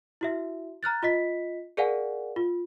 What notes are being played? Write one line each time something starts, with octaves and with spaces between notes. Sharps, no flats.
E4 F#4 E5
A#5 F6 F#6 A6
F4 D#5 B6
G#4 A#4 D5 F5 F#5 G#5
F4